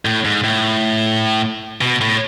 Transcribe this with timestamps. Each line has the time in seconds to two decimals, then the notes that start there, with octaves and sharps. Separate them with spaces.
0.05 A2
0.25 G#2
0.44 A2
1.81 B2
2.01 A2